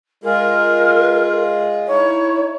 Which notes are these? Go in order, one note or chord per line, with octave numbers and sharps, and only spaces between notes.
G#3 F4 G#4 A#4
D#4 E4 C#5